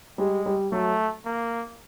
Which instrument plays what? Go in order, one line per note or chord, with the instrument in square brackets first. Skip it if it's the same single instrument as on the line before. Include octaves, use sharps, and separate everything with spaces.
[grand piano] G3 [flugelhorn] G#3
[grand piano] G3
[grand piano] F#3 [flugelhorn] A3
[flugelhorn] A#3